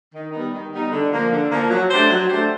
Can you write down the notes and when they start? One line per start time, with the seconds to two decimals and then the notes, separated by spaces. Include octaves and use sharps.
0.13 D#3
0.32 G3 B3 D#4
0.52 D#3
0.72 G3 B3 D#4
0.91 D3
1.11 F3 A#3
1.31 D3
1.51 F3 A#3
1.70 F#3
1.90 A3 D4 G4 C5
2.10 F#3
2.29 A3 D4 G4 C5